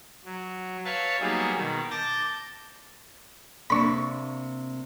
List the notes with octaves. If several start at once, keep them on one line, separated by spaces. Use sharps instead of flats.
F#3
B4 C#5 E5 F5 A5 C#6
F#3 G3 A#3 B3 D#4 G#4
B2 D#3
A5 D6 G6 A6 A#6
C3 A#3 D4 B5 C#6